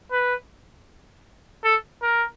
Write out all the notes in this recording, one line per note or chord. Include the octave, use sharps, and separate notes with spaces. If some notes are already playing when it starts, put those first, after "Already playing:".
B4
A4
A#4